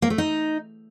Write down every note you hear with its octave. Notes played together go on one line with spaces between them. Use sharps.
A#3
A3
D#4